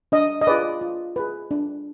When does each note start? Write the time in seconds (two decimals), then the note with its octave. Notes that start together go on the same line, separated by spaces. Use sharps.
0.12 D4 D#5
0.41 D#5
0.47 F4 G#4 B4 D5
0.81 F4
1.16 G#4 B4
1.51 D4